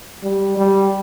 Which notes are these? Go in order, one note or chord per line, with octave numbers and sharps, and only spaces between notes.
G3
G3